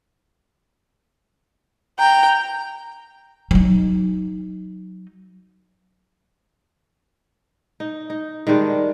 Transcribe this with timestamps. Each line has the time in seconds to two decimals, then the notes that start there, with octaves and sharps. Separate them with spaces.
1.99 G5 A#5
3.51 F#3 D#4
7.80 D#4
8.10 D#4
8.47 D#3 G3 G#3 D4